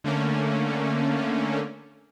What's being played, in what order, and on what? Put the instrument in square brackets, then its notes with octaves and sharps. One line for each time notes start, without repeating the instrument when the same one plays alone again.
[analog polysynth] D3 A3 A#3 C#4